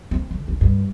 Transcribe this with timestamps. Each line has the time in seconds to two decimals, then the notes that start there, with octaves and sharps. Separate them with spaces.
0.11 C4
0.31 D2
0.48 D#4
0.61 G2